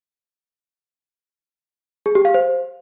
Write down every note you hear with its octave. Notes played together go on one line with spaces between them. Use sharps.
G#4
G4
F5
C5